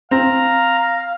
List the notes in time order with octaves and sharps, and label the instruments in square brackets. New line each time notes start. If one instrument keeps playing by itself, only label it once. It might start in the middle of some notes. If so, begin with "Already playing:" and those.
[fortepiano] C4 [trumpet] F5 [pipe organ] A#5